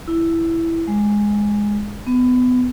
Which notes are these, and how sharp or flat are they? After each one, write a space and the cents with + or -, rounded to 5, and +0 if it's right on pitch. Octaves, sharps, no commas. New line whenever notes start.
E4 +5
G#3 -5
B3 +25